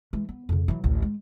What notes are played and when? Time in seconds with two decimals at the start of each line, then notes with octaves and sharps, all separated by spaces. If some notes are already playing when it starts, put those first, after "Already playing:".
0.13 E3 G#3
0.29 B3
0.49 F2 C#3
0.68 E3 F#3
0.84 A1 D2
1.02 G#3